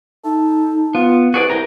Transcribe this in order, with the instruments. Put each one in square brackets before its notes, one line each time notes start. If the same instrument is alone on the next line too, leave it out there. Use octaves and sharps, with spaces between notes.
[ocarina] D#4 [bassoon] A4
[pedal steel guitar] B3 [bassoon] F4
[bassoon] C2 [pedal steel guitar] F#4 G#4 D5 [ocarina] B4
[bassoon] C2 [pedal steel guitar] G4 A#4 A#5